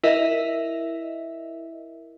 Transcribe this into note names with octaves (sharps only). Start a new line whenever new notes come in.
E4 A#4 D#5 E5